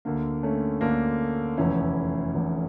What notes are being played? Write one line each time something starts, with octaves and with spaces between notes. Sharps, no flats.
D2 D3 A#3
A3 C#4
D2 D3 A#3 D4
F1 E2 E3 C#4 E4
F1 E2 E3